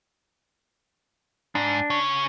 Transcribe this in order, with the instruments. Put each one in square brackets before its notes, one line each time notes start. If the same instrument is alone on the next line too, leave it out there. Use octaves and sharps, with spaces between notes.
[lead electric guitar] G#2 [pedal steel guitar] D4
[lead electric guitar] C#3 C#5